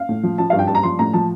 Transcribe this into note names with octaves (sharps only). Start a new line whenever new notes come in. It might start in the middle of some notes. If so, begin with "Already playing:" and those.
Already playing: F5
A2
F3
F3 A5
G2 F5
G5
G2 A5
A#5
F3 C6
A2 A#5
F3 A5